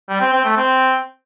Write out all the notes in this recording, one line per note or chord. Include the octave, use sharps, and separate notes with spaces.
G3
C4
C4
A3
C4